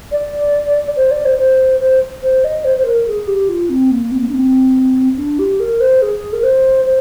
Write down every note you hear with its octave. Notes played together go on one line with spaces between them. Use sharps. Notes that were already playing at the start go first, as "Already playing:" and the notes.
D5
C5
D5
C5
C5
C5
C5
D#5
C5
C5
A#4
G#4
G4
F4
C4
A#3
C4
A#3
D4
C4
D4
G4
A#4
C5
G#4
A#4
C5
C5